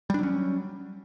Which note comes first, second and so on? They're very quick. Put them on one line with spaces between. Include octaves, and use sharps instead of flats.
G3 D4 F#3 C#4